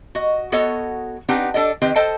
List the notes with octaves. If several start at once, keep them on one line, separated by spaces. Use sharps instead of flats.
F#4 D#5
B3 F#4 A4 C#5 D#5
C4 D4 D#4 G4 B4 F#5
D4 A4 D5 D#5
D#3 C4 G4 B4 D#5
A4 C5 D#5 G5 A5